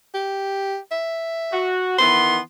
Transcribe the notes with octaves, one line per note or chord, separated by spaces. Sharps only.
G4
E5
F#4
D#3 E3 B3 C6